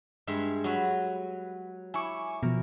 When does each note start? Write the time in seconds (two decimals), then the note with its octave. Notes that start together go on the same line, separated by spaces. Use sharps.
0.27 G2 G#3 E5
0.64 F#3 F#4 B4
1.94 E4 G#5 C#6 D6
2.43 B2 F3 A#4